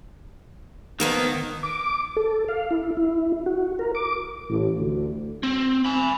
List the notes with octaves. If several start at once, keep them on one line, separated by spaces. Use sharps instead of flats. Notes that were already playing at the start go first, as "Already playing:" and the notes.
F2 D#3 A#3 B3
D6
A4
F5
E4
E4
F#4
A#4
D6
A1
D2
C4
G#5 B5